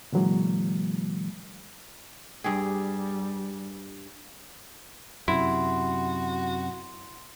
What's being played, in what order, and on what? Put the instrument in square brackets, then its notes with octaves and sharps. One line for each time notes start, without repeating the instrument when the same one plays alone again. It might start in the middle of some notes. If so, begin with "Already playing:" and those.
[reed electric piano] A#2 D3 E3 F#3 G#3 A#3
[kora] G2 G4 G#4 [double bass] G3
[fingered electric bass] F#2 C3 [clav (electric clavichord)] E4 [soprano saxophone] F#4 [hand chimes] C6